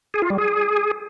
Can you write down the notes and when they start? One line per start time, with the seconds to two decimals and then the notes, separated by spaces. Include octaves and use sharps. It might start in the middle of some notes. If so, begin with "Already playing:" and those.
0.14 G#4
0.22 F4
0.30 G3
0.38 G#4